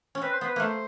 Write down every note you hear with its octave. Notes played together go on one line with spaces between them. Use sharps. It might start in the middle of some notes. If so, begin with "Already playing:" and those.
C#4
C4 B4
C5
B3 B4
A3 A#3 C5